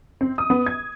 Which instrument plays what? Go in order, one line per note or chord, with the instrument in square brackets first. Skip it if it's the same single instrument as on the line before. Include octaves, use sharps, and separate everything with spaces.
[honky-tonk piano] C4
D#6
B3
G#6